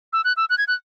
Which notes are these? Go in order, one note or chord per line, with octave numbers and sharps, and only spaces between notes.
E6
F#6
E6
F#6
G#6
F#6